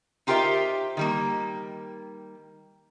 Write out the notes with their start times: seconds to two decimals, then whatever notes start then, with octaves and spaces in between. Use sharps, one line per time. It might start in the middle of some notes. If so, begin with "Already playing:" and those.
0.27 D#4 F4 G4 A#4 C5 E5
0.97 D#3 G3 A#3